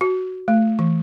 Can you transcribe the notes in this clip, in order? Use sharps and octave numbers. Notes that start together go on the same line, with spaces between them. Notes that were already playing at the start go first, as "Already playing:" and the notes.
F#4
A3
E3